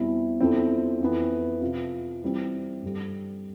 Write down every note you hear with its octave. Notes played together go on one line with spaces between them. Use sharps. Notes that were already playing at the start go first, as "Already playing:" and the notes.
Already playing: E2 B2 G3 C4 E4
E2 D3 F3 C4 E4
F2 E3 B3
C3 F3 B3 F4
E3 G3 C4
G2 D3 G3